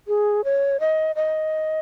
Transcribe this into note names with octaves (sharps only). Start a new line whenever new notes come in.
G#4
C#5
D#5
D#5